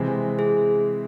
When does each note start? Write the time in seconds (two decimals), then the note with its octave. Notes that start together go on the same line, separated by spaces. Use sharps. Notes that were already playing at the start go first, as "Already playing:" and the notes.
Already playing: C3 E3 G#3 C4
0.39 G#4